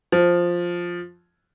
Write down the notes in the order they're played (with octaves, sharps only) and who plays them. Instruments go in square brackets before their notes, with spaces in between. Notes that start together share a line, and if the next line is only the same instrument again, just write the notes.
[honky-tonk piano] F3